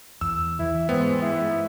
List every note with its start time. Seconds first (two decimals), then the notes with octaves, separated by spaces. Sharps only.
0.21 E2 E6
0.59 E3 E4
0.89 G#2 G#3 B3 C4
1.22 E4